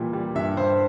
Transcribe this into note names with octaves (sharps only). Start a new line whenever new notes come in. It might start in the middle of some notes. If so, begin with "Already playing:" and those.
Already playing: A#2 E3 G3
G3
G2 E5
G2 C5